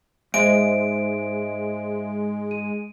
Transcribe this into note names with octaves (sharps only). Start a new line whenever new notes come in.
G#2 G#3 C5 D#5 E5 D7
D#7